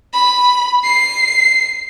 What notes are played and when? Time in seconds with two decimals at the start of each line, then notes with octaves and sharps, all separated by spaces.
0.14 B5
0.84 C7